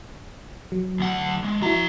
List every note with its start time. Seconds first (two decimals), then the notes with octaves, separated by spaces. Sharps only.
0.72 F#3
0.99 D2 F#5
1.44 G#3
1.62 F3 E4 F#4 A#5